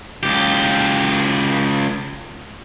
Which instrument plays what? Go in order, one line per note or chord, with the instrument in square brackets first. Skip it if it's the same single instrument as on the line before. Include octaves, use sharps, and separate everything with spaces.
[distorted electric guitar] C#2 G4